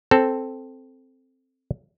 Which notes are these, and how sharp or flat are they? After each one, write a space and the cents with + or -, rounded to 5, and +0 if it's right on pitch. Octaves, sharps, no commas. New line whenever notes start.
C4 +0 A4 +0